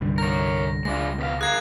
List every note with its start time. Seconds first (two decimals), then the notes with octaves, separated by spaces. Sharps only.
0.01 C2 G2 D3
0.18 A#4 C#5 A#6
0.85 C#2 G#3 D4 F4 A#6
1.18 B2 B4 F5
1.41 G#4 A#4 F5 F#6 G#6